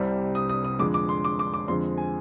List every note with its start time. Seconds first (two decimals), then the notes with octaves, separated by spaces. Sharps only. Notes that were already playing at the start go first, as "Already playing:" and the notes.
Already playing: C2 C3 G3 C4
0.35 D#6
0.49 D#6
0.65 D#6
0.79 F2 D3 G#3 D6
0.94 D6
1.09 C6
1.25 D6
1.39 D6
1.54 D6
1.68 F2 D3 G#3 C4 C6
1.98 G#5